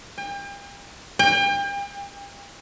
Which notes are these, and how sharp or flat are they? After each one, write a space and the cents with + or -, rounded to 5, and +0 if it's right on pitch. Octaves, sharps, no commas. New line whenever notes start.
G5 +40
G5 +35